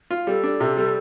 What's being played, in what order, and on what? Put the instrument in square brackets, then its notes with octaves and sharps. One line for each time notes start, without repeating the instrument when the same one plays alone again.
[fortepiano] F4
[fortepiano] G3 [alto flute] A4
[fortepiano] D4
C3
G3